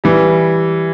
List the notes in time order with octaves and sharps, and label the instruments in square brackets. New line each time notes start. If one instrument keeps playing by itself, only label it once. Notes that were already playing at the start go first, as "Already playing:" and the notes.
[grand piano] E3 G3